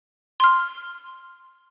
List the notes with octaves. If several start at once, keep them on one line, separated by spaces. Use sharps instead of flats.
C6 F6